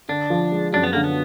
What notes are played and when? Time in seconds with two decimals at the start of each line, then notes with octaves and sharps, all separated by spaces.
0.09 D3 D4
0.30 F3
0.52 G#3
0.73 F#2 D4
0.83 B3
0.93 D3 A#3
1.04 B3